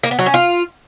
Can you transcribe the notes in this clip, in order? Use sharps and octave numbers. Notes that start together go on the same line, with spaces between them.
A#3
B3
F#3
C#4
F4